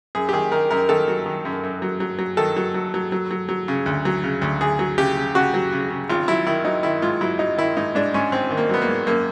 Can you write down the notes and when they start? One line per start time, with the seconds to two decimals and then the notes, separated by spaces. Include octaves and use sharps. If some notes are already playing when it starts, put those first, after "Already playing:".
0.15 F#2 G#4
0.29 G4
0.33 D#3 G#4
0.52 D#3 A#4
0.71 F#2 A#4
0.89 D#3 A4
1.08 F#3
1.26 D#3
1.45 F#2
1.63 F#2
1.82 F#3
2.00 F#3
2.19 F#3
2.37 D#3 A4
2.57 F#3
2.74 F#3
2.94 F#3
3.12 F#3
3.31 F#3
3.49 F#3
3.68 C#3
3.86 D2
4.05 F#3
4.24 C#3
4.42 D2
4.61 D2 G#4
4.79 F#3
4.98 C#3 G4
5.17 C#3
5.35 C#3 F#4
5.54 F#3
5.72 C#3
5.90 C#3
6.10 G#1 F4
6.28 F#3 E4
6.47 D#3 E4
6.65 F#3 D#4
6.83 D#3 E4
7.02 G#2 F4
7.21 F#3 E4
7.39 F#3 D#4
7.58 D#3 E4
7.77 G#2 D#4
7.95 G#2 D4
8.14 G#2 C#4
8.32 G#1 C4
8.51 D#3
8.57 A#3
8.69 F#3 B3
8.82 A#3
8.88 G#2
9.07 F#2 A#3